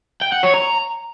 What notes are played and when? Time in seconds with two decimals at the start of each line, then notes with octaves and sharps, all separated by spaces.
0.22 G5
0.32 F#5
0.43 C#5
0.54 A#5